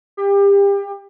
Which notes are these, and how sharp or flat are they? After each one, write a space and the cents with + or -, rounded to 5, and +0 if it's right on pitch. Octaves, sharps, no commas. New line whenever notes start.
G4 +30